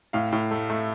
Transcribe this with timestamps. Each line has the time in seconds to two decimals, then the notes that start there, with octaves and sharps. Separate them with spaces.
0.13 A2 F5
0.32 A2
0.51 A3
0.70 A3